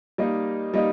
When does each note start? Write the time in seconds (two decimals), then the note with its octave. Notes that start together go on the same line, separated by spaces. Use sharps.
0.18 G3 A#3 D#4 D#5
0.74 G3 A#3 D#4 D#5